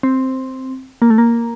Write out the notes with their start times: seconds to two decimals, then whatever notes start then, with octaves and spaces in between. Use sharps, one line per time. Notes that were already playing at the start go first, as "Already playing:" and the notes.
0.03 C4
1.02 A#3
1.10 A3
1.18 A#3